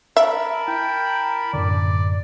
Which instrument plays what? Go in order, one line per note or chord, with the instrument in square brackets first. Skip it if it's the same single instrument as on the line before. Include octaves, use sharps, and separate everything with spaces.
[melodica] A#4 A5 B5 [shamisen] E5
[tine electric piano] E4 [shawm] G5
[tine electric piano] F#2 A2 D3 [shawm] D5